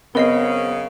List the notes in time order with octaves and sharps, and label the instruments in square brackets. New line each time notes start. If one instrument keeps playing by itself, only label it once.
[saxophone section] F#2 C#3 [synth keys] B3 C4 [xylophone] A#4 D#5 C7